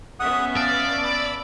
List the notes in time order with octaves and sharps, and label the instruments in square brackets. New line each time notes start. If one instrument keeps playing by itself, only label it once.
[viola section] B3 C#4 E5 [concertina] F#5 D#6
[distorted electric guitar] D5 [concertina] F5 A5 E6
[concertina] B5 E6